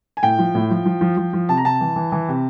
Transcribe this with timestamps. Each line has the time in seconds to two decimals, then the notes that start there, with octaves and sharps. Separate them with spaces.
0.17 G#5
0.23 A2 G5
0.39 F3
0.55 A2
0.70 F3
0.86 F3
1.01 F3
1.17 F3
1.33 F3
1.49 C3 A5
1.57 A#5
1.64 C3 A5
1.81 E3
1.96 E3
2.12 E3
2.28 C3